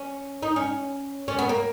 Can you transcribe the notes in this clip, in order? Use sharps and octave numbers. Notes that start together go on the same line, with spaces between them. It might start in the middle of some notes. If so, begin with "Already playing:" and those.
Already playing: C#4
D#4
C#4
C#4
B3
A#3